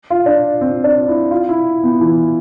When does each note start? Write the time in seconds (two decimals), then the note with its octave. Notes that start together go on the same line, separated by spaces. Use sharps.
0.10 F4
0.26 D4
0.61 C4
0.84 D4
1.08 E4
1.31 F4
1.49 E4
1.83 B3
2.01 E3